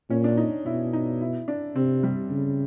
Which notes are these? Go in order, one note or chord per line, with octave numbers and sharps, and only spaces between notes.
A#2 C#4
D4
D#4
B2 E4
D#4
E4
D4
C3 C4
G3
C#3